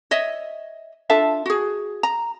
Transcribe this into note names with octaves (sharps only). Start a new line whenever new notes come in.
C#5 D#5 E5
D4 F4 A4 E5
F#4 G#4
A#5